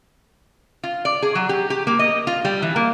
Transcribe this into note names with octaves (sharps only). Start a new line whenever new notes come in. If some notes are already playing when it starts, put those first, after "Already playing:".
F4
D5
G#4
F#3
G4
G4
A#3
D#5
F4
G3
E3
A#3